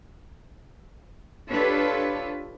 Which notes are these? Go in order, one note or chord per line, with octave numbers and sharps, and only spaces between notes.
D4 F4 G4 A4 B4 C#5